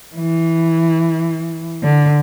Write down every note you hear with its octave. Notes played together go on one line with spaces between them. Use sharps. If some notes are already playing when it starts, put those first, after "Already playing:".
E3
D3